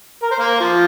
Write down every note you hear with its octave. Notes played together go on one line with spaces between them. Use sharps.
A#4
C5
A#3 A#4
F3 F4